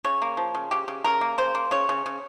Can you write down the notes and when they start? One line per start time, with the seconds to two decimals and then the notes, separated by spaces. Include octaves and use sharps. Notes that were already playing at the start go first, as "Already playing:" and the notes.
0.04 C#3 C#5
0.22 A#3
0.37 F3
0.55 C#3
0.71 C#3 G4
0.88 C#3
1.04 C#3 A#4
1.21 A#3
1.38 C#3 C5
1.55 A#3
1.71 C#3 C#5
1.89 C#3
2.06 C#3